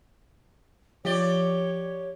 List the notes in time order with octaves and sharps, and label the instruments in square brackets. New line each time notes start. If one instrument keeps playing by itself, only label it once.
[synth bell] F3 G7 [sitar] G4 D5 [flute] C#5